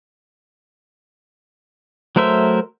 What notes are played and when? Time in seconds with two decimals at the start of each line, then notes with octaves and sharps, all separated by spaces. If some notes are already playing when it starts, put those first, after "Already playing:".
2.16 F#3 A3 A#4 C5 E5